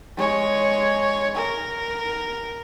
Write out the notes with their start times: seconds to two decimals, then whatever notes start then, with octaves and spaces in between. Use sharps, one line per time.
0.17 G#3 C#5
1.35 A#4